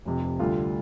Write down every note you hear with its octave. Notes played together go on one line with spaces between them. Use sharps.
F1 F2 C3
D2 D3 G3 F4